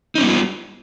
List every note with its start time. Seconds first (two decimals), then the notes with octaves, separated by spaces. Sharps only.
0.15 D#4
0.18 C#4
0.21 B3
0.24 G3
0.26 F4